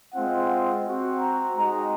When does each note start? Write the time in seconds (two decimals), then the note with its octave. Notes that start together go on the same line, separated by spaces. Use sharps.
0.14 G#3 C4 F4 F#5
0.86 C4 F#4
1.20 A#5
1.56 G#3 D#4 F#4 A#5